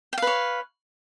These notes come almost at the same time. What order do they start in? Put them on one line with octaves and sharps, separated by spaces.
G5 F5 B4 C#5